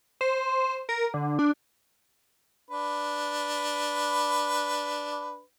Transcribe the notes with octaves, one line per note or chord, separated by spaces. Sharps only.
C5
A#4
D3
D4
D4 B4